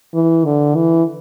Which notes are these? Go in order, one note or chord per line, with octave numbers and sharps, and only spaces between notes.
E3
D3
E3